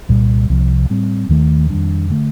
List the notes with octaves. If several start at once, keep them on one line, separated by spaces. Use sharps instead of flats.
C2 A#2 G3
C2 C3 F3
A2 G3 C4
D#2 D#3 A3
F2 D#3 G3 D4
D3 A3